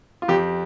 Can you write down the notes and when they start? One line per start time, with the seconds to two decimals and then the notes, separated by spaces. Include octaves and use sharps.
0.22 F4
0.28 F2 G4